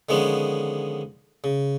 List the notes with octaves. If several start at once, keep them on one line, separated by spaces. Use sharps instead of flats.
D3 D#3 F3 G#3 B3 C#4
C#3